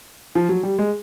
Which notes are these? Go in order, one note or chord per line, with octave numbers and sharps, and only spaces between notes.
F3
F#3
G3
G#3